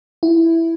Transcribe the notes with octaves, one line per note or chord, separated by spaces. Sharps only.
E4